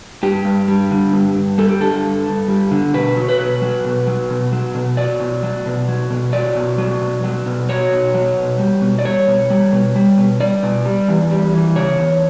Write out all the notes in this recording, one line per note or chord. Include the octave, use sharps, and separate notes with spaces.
G2 G4
G2
G3
D3
G2
G2
G3 A4
G4
D3 A4
G2
G2
G3
D3
B2 B4
F#3
B4
B2
F#3
B2
F#3
B2
F#3
B2
F#3 D5
B2
F#3
B2
F#3
B2
F#3 D5
B2
F#3
B2
F#3
B2
F#3 C#5
B2
F#3
B2
G3
B2
D5
G3 C#5
B2
G3
B2
G3
B2
G3 D5
B2
G3
E2
G3
E3
C#3 C#5
E2